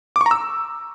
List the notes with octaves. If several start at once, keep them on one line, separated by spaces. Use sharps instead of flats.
D6
C#6
A#5
E6